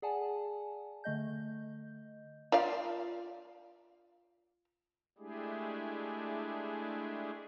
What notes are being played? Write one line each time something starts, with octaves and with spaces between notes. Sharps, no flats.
G#4 D5 F#5 G#5 A5
D3 A3 D#5 G6
F4 D5 F5
G#3 A3 D4 E4 G4 G#4